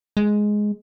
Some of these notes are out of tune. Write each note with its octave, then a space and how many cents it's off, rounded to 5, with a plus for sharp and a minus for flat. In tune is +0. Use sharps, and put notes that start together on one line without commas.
G#3 +5